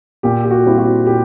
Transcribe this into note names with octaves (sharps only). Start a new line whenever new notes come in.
A#2 G4
G4
F#4
G3 C4 E4
F#4
A#2 G4